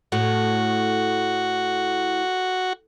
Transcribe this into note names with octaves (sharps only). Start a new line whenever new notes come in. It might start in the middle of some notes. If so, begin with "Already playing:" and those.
A2 F#4